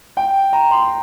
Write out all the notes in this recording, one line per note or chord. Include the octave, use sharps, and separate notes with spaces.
G5
A#5
C6